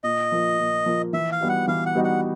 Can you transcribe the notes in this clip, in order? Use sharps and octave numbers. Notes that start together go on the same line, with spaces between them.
A#2 D#5
F3 A#3
A#2
F3 A#3
E3 E5
F5
G3 B3 D#4 F#4
F#5
E3 F5
F#5
G3 B3 D#4 F#4
F#5